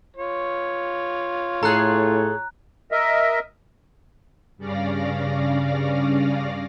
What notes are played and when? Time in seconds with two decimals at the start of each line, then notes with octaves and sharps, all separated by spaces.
0.16 F4 C#5
1.63 A2 G#4 A4 A#5 F#6
2.92 A#4 D#5 E5
4.58 G2 C#3 C#4 D5 F5 A#6